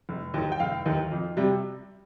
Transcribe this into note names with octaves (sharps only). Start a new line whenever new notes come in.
F1
D#2 D#3
G5
F1 F5
D#2 D#3
F2
C3 G3